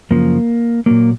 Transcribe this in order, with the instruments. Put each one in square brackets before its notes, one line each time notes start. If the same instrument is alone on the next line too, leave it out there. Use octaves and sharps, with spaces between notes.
[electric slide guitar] F#2 C#3 F3 A#3
A#2 F#3 A#3